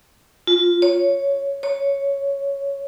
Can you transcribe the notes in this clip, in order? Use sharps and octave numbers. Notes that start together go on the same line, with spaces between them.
F4
C#5
C#5